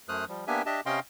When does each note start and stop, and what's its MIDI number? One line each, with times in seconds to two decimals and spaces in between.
0.09 0.25 42
0.09 0.25 57
0.09 0.25 72
0.09 0.25 87
0.09 0.25 89
0.09 0.25 90
0.29 0.45 53
0.29 0.45 55
0.47 0.62 58
0.47 0.62 59
0.47 0.62 62
0.47 0.62 67
0.47 0.62 76
0.47 0.62 80
0.66 0.80 62
0.66 0.80 67
0.66 0.80 75
0.66 0.80 76
0.66 0.80 81
0.86 1.00 48
0.86 1.00 61
0.86 1.00 75
0.86 1.00 77
0.86 1.00 79
0.86 1.00 84